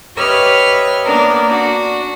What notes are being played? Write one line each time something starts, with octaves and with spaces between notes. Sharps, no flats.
G4 B4 C#5 D#5 E5 F6
A#3 B3 D4 A#4
D4 F#4